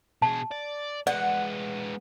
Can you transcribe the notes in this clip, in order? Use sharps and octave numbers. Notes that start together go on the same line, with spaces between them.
B2 G#4 A5
D5
G#3 B3 D5 F#5